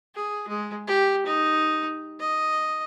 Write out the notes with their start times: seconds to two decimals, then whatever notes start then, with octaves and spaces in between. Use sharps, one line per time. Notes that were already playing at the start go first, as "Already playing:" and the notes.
0.15 G#4
0.48 G#3
0.87 G4
1.26 D#4
2.20 D#5